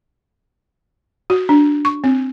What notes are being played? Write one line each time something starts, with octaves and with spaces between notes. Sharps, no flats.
F#4
D4
C#6
C4